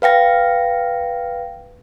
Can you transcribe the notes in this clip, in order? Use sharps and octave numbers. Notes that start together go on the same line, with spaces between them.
B4 F5 G5 A#6